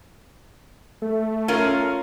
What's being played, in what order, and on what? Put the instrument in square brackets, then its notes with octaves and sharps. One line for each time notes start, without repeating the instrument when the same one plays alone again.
[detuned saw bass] A3
[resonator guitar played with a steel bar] C#4 F4 A#4